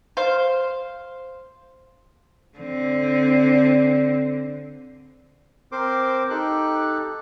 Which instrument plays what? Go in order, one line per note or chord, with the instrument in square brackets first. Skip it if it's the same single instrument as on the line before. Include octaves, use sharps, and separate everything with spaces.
[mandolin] C5 F5
[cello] D3 C4
[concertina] C4 A#4 C5 C6 D6
D#4 G4 A4 F#6